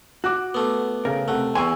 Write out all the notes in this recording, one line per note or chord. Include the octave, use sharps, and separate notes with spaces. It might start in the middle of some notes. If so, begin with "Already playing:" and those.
F#4 D6 F#6
A3 B3
C#3 A#4
C3 A3 F#5
E2 E3 G#5 C6 C#6 E6